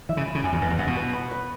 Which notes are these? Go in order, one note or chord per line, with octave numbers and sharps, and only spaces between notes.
E3 E5
C#3
B5
C#3
F#2 G#5
E2
F#2 B4
E2
F#2 F#5
B2
B4
B5
B4